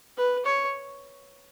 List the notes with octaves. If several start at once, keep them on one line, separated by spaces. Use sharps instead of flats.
B4
C#5